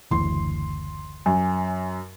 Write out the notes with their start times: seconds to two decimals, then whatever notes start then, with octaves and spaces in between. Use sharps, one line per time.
0.11 F#1 D2 E3 C6
1.26 F#2 G#5